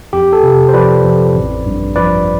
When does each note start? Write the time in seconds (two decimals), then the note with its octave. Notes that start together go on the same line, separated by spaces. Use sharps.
0.13 F2 G4
0.33 A4
0.43 C3
0.69 C5
0.74 F3 B4 D5
1.04 F2
1.35 A1
1.66 G2
1.96 F3 B4 D5